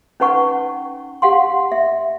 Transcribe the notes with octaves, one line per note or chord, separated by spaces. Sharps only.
C#4 D#4 B4 F#5 C#6
G4 F5 F#5 C6
E5